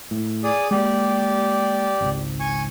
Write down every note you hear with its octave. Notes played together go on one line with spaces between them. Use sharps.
A2
G#4 D5 D#6
G#3 A#3 G4 D5
G#1 C#2
G#5 C#6